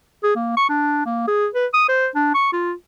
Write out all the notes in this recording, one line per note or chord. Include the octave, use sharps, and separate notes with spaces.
G#4
A#3
C#6
D4
A#3
G#4
B4
D#6
C5
D4
C#6
F4